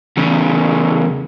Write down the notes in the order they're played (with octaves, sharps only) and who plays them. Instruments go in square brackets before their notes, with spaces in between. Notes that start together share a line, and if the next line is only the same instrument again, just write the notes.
[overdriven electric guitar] E2 C#3